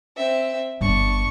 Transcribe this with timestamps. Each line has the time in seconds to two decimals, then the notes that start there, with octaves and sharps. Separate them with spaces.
0.17 C4 E5
0.81 G1 D4 C#6